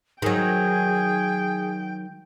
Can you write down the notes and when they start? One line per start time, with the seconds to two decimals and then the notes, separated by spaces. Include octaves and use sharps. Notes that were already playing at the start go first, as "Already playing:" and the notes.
0.22 D#3 F#3 G#4 G5